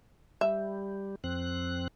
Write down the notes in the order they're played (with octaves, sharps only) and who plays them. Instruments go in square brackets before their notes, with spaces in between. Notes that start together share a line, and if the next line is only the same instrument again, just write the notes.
[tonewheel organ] G3 [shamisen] E5
[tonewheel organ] F2 C4 F#6